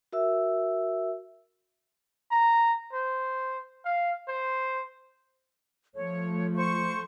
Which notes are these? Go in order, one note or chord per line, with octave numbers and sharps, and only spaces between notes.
F#4 A#4 E5 E6
A#5
C5
F5
C5
F3 A3 C#5
C5 C#6